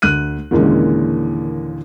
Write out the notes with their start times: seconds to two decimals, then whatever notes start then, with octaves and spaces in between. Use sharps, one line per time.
0.02 D2 F#6 D#7
0.51 D#2 A#2 D3 E3 G#3 C#4